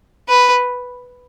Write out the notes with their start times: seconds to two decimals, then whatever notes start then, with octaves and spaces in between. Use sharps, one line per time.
0.29 B4